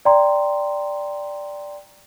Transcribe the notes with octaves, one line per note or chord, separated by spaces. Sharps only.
D5 G5 A#5 C6